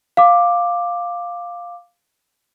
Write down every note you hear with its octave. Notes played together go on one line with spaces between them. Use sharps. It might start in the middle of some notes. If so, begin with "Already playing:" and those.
F5 D6